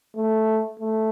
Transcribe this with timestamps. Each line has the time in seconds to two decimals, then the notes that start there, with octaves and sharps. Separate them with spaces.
0.16 A3
0.79 A3